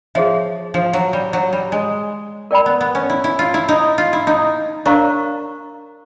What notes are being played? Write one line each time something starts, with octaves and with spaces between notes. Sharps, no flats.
F3 G#4 C#5 E5
F3
F#3
G3
F#3
G3
G#3
A#4 D5 G5 B5
B3
B3
C#4
E4
E4
F4
E4
D#4
F4
E4
D#4
D4 A#4 C#5 F5 A#5 C#6